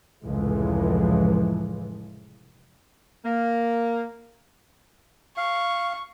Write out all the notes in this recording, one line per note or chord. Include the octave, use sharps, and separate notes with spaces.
F1 C#2 A2 E3 F3 G#3
A#3
F5 C#6